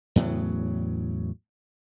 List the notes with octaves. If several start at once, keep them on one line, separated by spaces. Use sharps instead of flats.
E2 A2 C#3 F#3